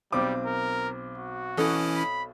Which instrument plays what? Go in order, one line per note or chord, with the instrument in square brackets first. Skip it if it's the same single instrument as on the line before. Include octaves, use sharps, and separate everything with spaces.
[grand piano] B1 C4 D6 [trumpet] G3
[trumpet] A#4
F#4
[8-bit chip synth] E3 C#4 E4 [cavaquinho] A4 C#5 D#5
[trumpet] B5